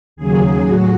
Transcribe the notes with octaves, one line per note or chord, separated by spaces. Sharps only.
D#2 C#3 F#3 G#4
A2 F#3 F#4